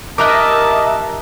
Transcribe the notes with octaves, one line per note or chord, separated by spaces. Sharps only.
D#4 G4 A#4 D#5 E5 A5 D6 F#6